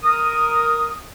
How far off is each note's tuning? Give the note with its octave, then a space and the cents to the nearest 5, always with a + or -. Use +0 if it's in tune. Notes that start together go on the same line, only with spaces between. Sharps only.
A#4 +0 D#6 +0